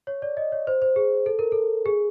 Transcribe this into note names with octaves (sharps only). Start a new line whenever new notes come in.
C#5
D5
D#5
C#5
C5
C5
G#4
A4
A#4
A4
G#4